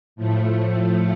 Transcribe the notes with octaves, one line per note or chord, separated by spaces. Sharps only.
A2 F3 A3